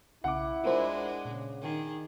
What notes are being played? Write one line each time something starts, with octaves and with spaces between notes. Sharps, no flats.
B1 C#3 E4 F#5 D6
G#3 D4 F4 A#4 C5
A#2 C#3
D#3 G#4